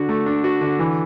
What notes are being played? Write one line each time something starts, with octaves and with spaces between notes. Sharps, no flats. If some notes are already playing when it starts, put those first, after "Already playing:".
Already playing: D3 F#4
A3
D4
F#4
D3
E3